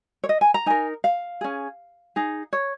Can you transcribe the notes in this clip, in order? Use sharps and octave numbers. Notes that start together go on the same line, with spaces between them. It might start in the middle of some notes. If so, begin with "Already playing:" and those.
C#5
D#5
G#5
A#5
D#4 A#4 G#5
F5
C#4 G#4
D#4 G#4
C#5